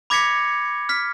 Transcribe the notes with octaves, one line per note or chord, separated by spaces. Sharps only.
B5 D6 G#6 A#6 B6 C#7
F6 B6